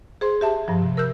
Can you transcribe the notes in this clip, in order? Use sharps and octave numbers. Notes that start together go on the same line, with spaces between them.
G#4 C5 C6
G4 E5 A5
G2 F3
C3
A#4 E6 F#6 G6